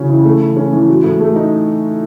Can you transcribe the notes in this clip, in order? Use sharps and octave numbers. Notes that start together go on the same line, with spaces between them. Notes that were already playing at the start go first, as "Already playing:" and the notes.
Already playing: C#3 E3 F#3 C#4
E4
A3
E3
C#4
E3
F#3
A2
A3
D#4